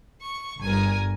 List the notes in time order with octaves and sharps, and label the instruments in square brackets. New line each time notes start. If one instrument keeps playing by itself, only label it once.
[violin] C#6
[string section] G1 [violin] A#4 G#5